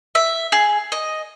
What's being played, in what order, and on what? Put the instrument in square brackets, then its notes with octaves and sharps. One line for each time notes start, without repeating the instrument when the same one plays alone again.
[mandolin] E5
G#4
D#5